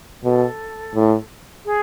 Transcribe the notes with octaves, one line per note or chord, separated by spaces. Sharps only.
B2 A4
A2
G#4